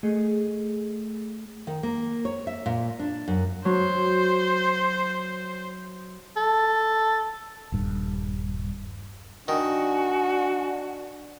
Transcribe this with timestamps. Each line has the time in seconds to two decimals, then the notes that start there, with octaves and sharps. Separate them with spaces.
0.03 A3 G#4 A4 D#5
1.67 D#3
1.83 A#3
2.25 C#5
2.47 E5
2.66 A#2
2.99 D4
3.28 F#2
3.65 F#3 C5
6.36 A4
7.72 D#1 G2
9.48 D#3 D4 F#4 G#5